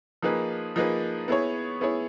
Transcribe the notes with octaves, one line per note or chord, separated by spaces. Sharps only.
F3 A#3 D#4 G#4 B4
F3 A#3 D#4 G#4 B4
B3 E4 G#4 C#5
B3 E4 G#4 C#5